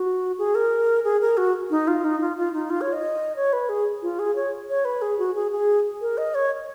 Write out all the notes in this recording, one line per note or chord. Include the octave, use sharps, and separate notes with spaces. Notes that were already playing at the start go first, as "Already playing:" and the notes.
Already playing: F#4
G#4
A#4
G#4
A#4
F#4
D#4
F4
D#4
F4
F4
D#4
F4
C#5
D#5
C#5
B4
G#4
F4
G#4
C#5
C#5
B4
G#4
F#4
G#4
G#4
A#4
D#5
C#5